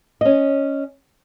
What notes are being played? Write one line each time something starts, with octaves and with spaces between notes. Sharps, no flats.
C#4 D#5